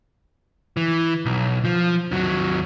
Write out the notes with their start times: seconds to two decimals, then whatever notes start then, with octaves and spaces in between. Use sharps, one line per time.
0.77 E3
1.26 B1
1.65 F3
2.11 D#2 F#3